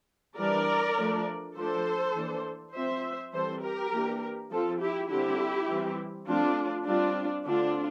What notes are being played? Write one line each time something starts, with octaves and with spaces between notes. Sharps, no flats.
E3 G3 D4 A#4 D5
F3 A3 D4
F3 A3 D4 A4 C5
E3 A#3 D4
F3 C4 C5 E5
E3 G3 C4 A4 C5
G4 A#4
E3 A#3 D4
F3 C4 F4 A4
E4 G4
D3 G3 C4 E4 G4
E3 G3 C4
F3 A3 C4 D4 F4
G3 C4 D4 F4
D3 A3 C4 D4 F4